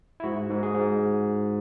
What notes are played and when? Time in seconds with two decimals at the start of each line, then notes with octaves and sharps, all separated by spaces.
0.20 E4
0.24 G#2 F#4
0.49 G#2
0.63 G#4
0.75 G#2